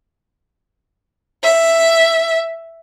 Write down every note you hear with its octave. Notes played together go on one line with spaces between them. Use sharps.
E5